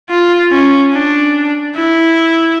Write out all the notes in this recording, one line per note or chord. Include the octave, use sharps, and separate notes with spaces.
F4
C#4
D4
E4